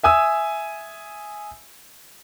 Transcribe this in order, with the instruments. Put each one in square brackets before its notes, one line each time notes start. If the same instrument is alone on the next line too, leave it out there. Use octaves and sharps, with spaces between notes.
[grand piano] E5 G#5 D#6 E6